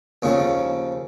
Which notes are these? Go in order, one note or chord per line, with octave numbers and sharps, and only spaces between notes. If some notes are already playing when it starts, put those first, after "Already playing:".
D#2 C#3 F3